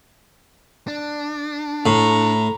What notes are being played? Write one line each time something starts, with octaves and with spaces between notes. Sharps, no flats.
D4
A2 A#5